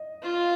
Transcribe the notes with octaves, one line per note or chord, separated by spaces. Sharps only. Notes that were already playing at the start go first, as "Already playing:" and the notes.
Already playing: D#5
F4